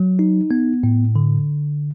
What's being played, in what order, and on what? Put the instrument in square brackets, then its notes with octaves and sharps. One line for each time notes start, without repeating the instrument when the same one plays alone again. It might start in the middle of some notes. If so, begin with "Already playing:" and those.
Already playing: [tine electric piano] F#3
D#4
B3
A2
D3